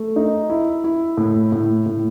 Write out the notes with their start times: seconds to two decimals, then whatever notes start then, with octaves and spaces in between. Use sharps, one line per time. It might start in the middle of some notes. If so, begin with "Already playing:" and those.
Already playing: A3
0.16 D#4
0.49 E4
0.84 E4
1.17 A2
1.52 A2
1.86 A2